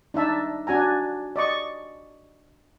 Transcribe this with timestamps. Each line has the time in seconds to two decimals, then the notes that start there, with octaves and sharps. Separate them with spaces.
0.14 D4 D#4 E5 A5
0.67 D4 F#4 G#5 A#5
1.36 D5 D#5 C#6